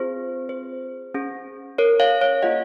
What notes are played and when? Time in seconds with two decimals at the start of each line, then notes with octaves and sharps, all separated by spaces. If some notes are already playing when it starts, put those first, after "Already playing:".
Already playing: C4 F4 G#4 C5
0.49 C5
1.14 C#4 G#4
1.78 A#4 C#5
2.00 C#5 F5
2.21 C#5 F5
2.42 A#3 F4 G#4 D#5 F#5